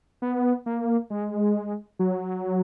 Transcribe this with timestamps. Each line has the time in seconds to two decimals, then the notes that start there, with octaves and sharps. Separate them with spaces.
0.22 B3
0.66 A#3
1.10 G#3
1.99 F#3